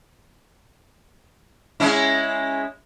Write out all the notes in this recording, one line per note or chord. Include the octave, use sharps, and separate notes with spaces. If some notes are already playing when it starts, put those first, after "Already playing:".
G#3 C#4 E4